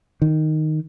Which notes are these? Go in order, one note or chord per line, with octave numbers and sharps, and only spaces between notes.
D#3